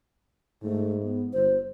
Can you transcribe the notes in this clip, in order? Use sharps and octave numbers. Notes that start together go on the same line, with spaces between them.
G#2 A3
B3
G1 C5